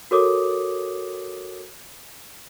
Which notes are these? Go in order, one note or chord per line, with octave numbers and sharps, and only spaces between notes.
F#4 A4 A#4 C#5 D6 D#6